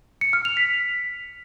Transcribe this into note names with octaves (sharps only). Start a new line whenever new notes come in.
C#7
F6
F7
B6